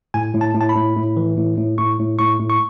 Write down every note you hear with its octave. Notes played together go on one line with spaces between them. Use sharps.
A2 G#5
A2
A5
A2
A5
B5
A2
A2
E3
A2
A2
A2 C#6
A2
A2 C#6
A2
C#6